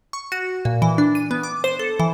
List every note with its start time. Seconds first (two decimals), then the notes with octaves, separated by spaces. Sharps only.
0.13 C#6
0.32 F#4
0.65 A#2
0.82 E3
0.98 D4
1.15 D#7
1.31 B3
1.43 D6
1.64 C5
1.79 A4
2.00 E3